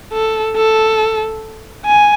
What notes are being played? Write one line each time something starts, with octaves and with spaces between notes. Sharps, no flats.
A4
A4
G#5